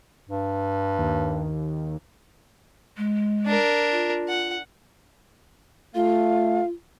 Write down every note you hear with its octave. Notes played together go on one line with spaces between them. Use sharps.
G2
D#2
G#3
D4 A#4
F4
F#5
A3 F4 F5